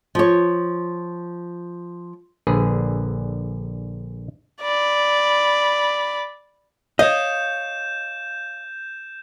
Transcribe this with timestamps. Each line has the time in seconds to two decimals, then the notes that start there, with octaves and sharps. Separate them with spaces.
0.15 F3 C#5
2.47 A#1 D3 G#4 B4
4.62 D5 B5
6.99 C#5 D#5 F5 G6 E7